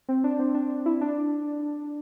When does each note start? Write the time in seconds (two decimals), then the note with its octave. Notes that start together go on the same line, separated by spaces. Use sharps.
0.08 C4
0.24 D4
0.39 C4
0.55 D4
0.70 D4
0.86 E4
1.01 D4